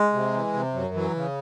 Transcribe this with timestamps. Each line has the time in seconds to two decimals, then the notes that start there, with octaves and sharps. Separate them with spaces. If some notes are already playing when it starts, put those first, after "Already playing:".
Already playing: G#3
0.13 C3
0.33 E3
0.54 C3
0.74 F#2 F#3
0.94 E3 F#3
1.15 C#3